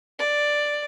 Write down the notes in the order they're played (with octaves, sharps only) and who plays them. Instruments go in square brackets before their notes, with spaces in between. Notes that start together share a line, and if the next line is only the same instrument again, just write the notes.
[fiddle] D5